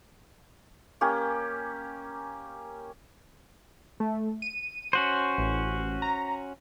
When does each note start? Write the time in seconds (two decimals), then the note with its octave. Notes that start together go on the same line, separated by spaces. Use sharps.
1.01 A#3 C#4 G4
4.00 A3
4.42 D#7
4.93 C#4 F#4 C5
5.38 A1
6.02 A#5